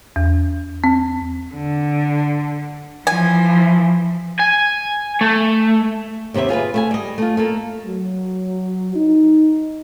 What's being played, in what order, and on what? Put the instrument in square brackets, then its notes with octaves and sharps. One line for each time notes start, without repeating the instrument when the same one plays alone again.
[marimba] E2
C4
[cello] D3
[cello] E3 F3 [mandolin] G#5
[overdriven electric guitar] G#5
A3
[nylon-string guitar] D#2 C3 B3 G4 E5
F4 G#4 A#4 B4
A3 E5 G#5
G3 D#5
A3 F4
A3 A#3 A4
[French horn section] F#3
D#4